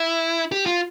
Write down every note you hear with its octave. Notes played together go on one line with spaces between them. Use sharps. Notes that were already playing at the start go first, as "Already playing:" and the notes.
Already playing: E4
G4
F4